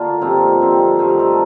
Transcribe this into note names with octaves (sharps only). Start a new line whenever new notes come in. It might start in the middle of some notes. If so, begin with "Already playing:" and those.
Already playing: D3 A#3 F4
G2 F3 C4 D#4
D3 F3 C4
G2 D#3 A3 C5
A#4
A4